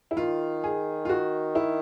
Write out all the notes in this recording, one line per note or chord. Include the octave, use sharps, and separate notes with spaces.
E4
D#3 F4
G#4
F4
F#4
E4